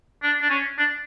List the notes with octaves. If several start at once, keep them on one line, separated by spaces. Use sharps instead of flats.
D4
D4
C#4
D4